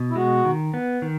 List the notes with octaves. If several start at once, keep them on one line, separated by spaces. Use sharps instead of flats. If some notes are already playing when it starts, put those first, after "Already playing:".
Already playing: B2
E4
G#3 F#4
D#3
B3
D#3